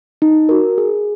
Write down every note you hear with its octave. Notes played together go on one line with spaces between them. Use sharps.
D#4
F#4 A#4
G#4